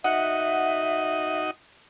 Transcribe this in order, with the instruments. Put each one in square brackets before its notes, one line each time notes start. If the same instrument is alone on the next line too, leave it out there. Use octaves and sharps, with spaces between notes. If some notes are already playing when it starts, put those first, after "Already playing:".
[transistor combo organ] D#4 F#4 D#5 [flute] E5 [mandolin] F#5